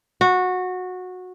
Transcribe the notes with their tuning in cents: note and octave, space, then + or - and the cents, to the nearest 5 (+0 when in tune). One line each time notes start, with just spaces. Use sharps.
F#4 -15